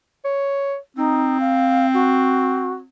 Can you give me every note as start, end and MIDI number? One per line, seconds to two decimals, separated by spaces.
0.25 0.76 73
0.97 2.86 60
0.97 1.38 63
1.40 1.86 77
1.94 2.74 66